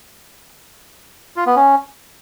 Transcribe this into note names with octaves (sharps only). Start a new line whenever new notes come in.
F4
B3
C#4